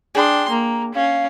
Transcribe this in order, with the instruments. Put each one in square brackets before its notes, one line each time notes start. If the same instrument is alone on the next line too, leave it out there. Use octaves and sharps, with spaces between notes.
[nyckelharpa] D4 C6 [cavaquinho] G#4 G5 D#6
[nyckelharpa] A#3 [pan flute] A#5
[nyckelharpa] C#4 [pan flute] F5